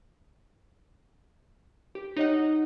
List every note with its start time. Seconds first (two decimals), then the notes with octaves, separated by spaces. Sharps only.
1.95 G4
2.17 D#4 C#5 D#5 F#5